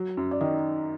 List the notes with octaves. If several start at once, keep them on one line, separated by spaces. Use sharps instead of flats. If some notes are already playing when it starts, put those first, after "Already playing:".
Already playing: F#3
F#2
D5
D#3 D#4 D#5